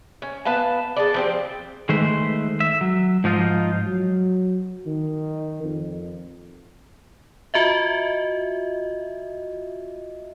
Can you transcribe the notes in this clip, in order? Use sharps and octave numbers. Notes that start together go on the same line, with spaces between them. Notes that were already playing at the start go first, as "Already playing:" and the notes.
C#4
B3 B4 F5 A5
G#4 A4 D5
F3 C4 G4
D#3 G#3 A3 B4 C5
E5
F#3
G#2 F3 D#4 F4
F#3
D#3
F2
F4 F#4 D#5 E5